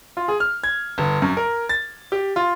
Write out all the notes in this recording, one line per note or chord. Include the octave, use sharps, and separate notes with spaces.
F4
G#4
F6
G#6
G1
F#2
A#4
A6
G4
F4